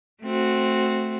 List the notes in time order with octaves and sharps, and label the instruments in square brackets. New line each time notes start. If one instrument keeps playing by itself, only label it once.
[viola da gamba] A3 C4 F#4